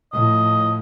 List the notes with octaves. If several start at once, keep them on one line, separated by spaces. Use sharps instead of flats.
A2 F3 D#5